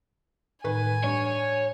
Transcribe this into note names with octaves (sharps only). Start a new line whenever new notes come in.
A2 D#3 B4 G#5
G2 C#5